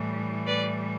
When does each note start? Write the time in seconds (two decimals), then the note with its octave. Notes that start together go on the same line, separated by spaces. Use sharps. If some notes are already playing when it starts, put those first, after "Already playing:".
Already playing: A2 E3 G3
0.47 B4 D5